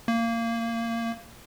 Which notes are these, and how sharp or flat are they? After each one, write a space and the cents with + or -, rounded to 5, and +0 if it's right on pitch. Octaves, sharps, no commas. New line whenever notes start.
A#3 -20